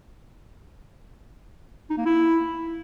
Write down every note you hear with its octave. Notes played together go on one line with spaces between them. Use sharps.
D#4
A#3
E4